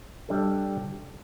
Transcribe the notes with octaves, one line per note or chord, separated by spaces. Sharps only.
G3 D4 A4